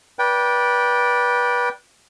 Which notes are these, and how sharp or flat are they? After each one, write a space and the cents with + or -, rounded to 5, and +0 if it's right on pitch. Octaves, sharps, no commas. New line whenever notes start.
B4 -25 D5 -10 G5 -5